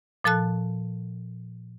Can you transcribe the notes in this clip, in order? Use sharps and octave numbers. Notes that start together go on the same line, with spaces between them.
A#2 F3 A4 A5 F#6